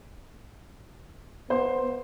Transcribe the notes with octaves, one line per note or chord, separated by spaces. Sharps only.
B3 C5 C6